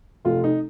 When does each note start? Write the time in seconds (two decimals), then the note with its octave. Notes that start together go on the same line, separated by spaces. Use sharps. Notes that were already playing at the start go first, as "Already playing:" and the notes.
0.25 F1 F4
0.44 D#4